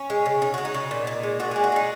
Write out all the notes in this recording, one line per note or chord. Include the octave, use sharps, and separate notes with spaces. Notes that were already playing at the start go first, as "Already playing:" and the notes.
Already playing: C#4
G#3
C#3
C#3 D#4
G#3 F#4
D#4
C#3
A#2
A#2
G#3
A#2 F#4
G#3 G#4
F#4
G#3 D#4